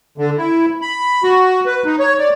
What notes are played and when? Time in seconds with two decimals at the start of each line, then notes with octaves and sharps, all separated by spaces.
0.18 D3
0.38 E4
0.82 B5
1.23 F#4
1.66 B4
1.85 D#4
1.99 C#5
2.19 D5